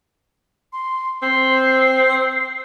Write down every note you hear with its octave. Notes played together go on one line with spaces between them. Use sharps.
C6
C4 C7